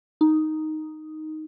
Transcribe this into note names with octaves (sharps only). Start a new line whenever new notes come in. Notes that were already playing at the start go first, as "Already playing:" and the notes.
D#4